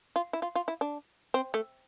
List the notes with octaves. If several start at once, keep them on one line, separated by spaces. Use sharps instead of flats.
F4
E4
F4
F4
E4
D4
C4
A3